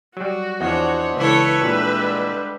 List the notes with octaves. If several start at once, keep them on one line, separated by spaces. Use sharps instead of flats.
F#3 G3 F#4
E2 F3 C4 D4 C5 C#5 D#5 F#5
C#2 E3 E4 A4 B4 C#5 E5
A#2 D3 E3 G3 G#3